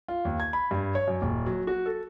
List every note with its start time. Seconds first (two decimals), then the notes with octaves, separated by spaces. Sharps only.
0.08 F4
0.25 D#2
0.40 G#6
0.53 B5
0.71 G2
0.95 C#5
1.08 F#2
1.22 D#1
1.46 F#3
1.67 F#4
1.86 A4